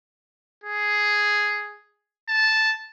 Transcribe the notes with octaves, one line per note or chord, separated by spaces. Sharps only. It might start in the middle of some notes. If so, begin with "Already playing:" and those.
G#4
A5